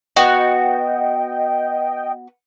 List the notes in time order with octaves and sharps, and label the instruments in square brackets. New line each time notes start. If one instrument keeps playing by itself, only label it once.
[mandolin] B3 F#4 [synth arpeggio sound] D#5 G5